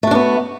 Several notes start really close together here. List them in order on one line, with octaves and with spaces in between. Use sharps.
A3 F#4 D4 B3